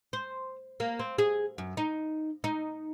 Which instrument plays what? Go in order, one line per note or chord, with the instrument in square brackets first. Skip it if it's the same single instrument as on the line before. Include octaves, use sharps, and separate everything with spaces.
[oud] C5
A#3
C4
G#4
F#2
D#4
D#4